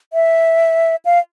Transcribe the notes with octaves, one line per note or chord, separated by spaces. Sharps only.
E5
F5